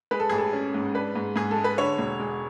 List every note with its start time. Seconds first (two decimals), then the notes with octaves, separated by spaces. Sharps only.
0.11 G#3 B4
0.20 A4
0.29 A1 G#4
0.38 A4
0.53 C#4
0.74 G#2
0.95 D4 B4
1.16 G#2
1.36 G#2 G#4
1.51 A4
1.57 G#3
1.64 B4
1.78 D3 C#5
1.98 E1
2.19 G#3